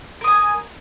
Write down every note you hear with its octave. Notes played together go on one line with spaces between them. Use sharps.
A#4 G#5 D#6